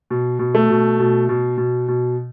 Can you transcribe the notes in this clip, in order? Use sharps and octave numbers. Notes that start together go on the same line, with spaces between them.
B2
B2
A3
B2
B2
B2
B2
B2